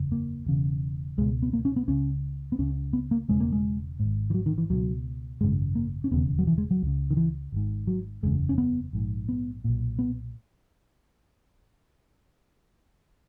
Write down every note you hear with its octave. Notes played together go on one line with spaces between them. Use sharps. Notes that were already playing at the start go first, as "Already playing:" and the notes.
Already playing: F#1 E2 C#3
A#3
E1 E2 C#3
C#2 B2 G#3
B3
A#3
C#4
B3
C#2 C#3 C#4
B3
C#2 C#3 C#4
B3
A#3
E1 E2 C#3 G#3
A#3
G#3
G#1 G#2
E3
F#3
D#3
E3
C#2 B2 F#3
G#1 F#2 C#3 G#3
A#3
C#4
E1 D#2 C#3 B3
F#3
E3
G#3
F#3
C#2 C#3
D#3
E3
G#1 G#2
F#3
F#1 E2 C#3 G#3
C#4
B3
A#1 G#2
B3
B1 A#2
B3